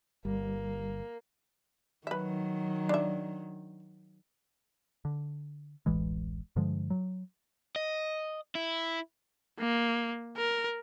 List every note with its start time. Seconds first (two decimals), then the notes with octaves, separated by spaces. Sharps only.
0.25 G1 G3 A#3
2.07 D#3 F#3 B4 E5
2.89 D4 E5
5.05 D3
5.86 D1 A1 E3 G#3
6.56 G2 D3 F3 G#3
6.90 F#3
7.76 D#5
8.55 E4
9.59 A#3
10.37 A#4